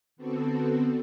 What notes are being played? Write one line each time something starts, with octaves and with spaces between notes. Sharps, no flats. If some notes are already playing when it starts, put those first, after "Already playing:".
D3 B3 C4 F#4 A4